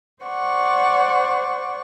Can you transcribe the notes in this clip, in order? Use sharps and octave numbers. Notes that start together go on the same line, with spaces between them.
C5 D5 F#5 C#6